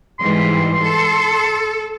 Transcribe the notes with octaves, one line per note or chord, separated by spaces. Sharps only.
G#2 E3 G3 C6
A4